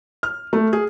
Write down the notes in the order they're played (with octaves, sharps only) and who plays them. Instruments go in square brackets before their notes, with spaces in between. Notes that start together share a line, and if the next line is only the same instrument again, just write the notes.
[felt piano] F6
A3
G#4